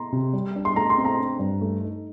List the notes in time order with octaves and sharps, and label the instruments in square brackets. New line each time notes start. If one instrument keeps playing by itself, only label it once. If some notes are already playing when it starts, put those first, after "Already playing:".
Already playing: [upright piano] A#5 C6
[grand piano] C3
G3
D4
[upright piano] C6
[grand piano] A3 [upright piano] A#5
[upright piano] C6
[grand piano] C4
[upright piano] A#5
[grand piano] D4
G2
A3
D#4